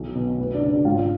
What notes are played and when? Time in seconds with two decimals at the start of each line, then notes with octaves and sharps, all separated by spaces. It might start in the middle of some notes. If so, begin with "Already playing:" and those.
Already playing: B1
0.15 B2
0.38 D2 B4
0.54 D4 D5
0.62 C#3
0.69 D4 D5
0.85 G#1 F4 F5